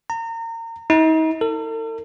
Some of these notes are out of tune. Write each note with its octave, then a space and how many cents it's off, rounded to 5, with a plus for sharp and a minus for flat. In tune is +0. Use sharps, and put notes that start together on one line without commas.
A#5 -30
D#4 +40
A4 +45